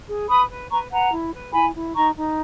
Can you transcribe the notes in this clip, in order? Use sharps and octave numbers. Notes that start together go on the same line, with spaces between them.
G#4
B4 B5 D#6
B4
B4 A#5 C#6
B4 F#5 A#5
E4
B4
E4 G#5 B5
E4
D#4 A#5 C#6
D#4